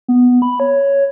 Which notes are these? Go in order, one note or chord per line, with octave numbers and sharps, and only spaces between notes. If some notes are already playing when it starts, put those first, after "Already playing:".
B3
B5
C#5